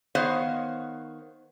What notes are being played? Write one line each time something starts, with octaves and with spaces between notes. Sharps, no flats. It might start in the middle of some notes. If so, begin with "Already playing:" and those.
D#3 B3 C5 C#5 F5